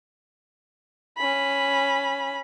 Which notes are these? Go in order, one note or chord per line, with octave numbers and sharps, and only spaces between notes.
C#4 B5